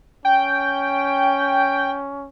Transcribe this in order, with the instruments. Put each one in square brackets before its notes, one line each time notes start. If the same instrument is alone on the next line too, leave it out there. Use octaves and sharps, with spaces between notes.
[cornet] C#4 [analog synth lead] G5